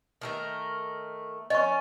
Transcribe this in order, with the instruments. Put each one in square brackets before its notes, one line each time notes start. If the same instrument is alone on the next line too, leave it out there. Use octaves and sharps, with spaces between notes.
[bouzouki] D#3 A3 A#4
[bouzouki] C#4 [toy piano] D#5 C#6